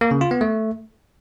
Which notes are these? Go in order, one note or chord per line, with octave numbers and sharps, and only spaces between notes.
A#3
C#3
F4
B3
A3